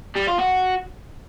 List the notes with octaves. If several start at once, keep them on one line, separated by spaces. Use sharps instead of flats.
G3
F4
F#4